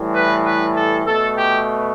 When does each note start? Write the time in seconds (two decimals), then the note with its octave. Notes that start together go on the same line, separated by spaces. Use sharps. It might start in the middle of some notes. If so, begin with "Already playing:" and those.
Already playing: A2 E3 G3
0.13 B4
0.45 B4
0.75 A4
1.06 B2 A3 A4
1.37 G4